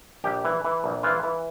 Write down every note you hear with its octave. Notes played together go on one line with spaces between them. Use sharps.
A#1 G4
E3
E3
A#1
E3 F4
E3